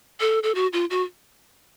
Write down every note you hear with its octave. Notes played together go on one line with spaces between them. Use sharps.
A4
A4
F#4
F4
F#4